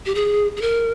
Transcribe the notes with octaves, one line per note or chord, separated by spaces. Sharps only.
G4
G#4
G#4
A#4